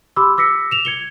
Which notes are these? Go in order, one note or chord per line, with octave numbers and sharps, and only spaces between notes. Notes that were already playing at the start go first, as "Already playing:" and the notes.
G4 B5 C6 D6 E6
D6 E6 A#6 B6 C#7
E7 F7
G#6 C#7 G7